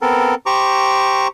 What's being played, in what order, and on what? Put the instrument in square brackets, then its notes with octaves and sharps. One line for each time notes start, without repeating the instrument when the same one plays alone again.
[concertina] B3 C4 A4 A#4
G4 C5 A#5 C#6 D6